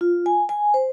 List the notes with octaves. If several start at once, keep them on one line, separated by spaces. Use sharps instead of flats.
F4
G#5
G#5
C5